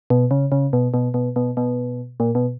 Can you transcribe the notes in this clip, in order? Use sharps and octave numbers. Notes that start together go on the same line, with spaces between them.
B2
C#3
C#3
B2
B2
B2
B2
B2
A#2
B2